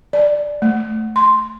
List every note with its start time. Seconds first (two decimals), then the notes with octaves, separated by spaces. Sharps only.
0.13 D5
0.62 A3
1.16 C6